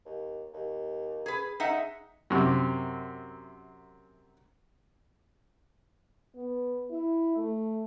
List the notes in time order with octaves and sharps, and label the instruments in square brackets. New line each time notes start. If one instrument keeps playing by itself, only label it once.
[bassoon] D#2
D#2
[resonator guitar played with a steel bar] G#4 B4
[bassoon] G#3 [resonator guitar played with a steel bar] D#4 E5 F#5
[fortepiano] F#2 C3
[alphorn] B3
E4
A3